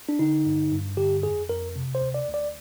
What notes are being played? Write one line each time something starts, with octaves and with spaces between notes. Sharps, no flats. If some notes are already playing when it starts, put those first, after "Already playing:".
D4
D3 D#4
G2
G2
D3 G4
F2 G#4
F2 A#4
C3
C5
D2
D5
D2
D5